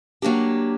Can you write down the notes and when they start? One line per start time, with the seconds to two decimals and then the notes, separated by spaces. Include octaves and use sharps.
0.22 F#3 A#3 D4 G4